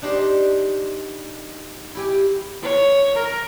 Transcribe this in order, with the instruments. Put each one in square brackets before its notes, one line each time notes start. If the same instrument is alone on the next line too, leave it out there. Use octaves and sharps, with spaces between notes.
[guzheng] D4 D#4 G4 C5
E4 G4 G#5
[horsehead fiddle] C#5
A#4